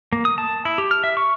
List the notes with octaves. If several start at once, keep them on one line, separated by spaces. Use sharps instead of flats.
A#3
D#6
A5
E4
G4
F6
E5
C#6